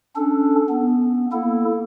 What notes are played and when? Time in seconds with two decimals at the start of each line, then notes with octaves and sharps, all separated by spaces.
0.16 C#4 D4 A4
0.69 B3
1.32 A#3 E4 A4